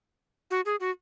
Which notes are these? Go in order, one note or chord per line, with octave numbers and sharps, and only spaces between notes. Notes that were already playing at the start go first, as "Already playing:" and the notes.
F#4
G#4
F#4